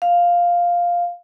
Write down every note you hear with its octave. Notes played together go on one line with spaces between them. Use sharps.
F5